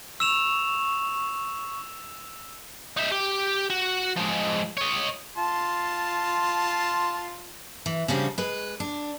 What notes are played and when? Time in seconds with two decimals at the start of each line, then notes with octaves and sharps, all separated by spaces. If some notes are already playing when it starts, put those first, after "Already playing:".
0.20 C#6 E6 E7 F7
2.97 D#4 E5
3.12 G4
3.70 F#4
4.17 F3 G#3
4.78 C#5 D#5
5.37 F4 A5 C6
7.86 E3
8.08 C#3 F3 G3 C#4 D4 F#4
8.38 G#3 B4
8.80 D4